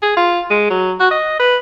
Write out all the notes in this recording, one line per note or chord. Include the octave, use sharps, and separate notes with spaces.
G#4
F4
G#3
F#3
F#4
D#5
B4